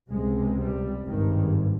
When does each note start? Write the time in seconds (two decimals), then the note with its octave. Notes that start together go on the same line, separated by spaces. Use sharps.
0.11 C#2 C3 G#3
0.58 G3
1.07 G#1 G2 D#3